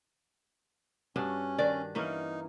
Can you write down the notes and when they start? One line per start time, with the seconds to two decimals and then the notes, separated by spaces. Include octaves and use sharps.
1.16 G2 C#4 D4 F#4
1.58 D#3 D4 D5
1.95 E3 A#3 C#4 D#4